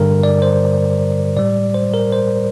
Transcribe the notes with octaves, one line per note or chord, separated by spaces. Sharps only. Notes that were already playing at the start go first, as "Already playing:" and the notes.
Already playing: G2 D3 G3 A#4
D5
C5
A2 G3 D5
C5
A#4
C5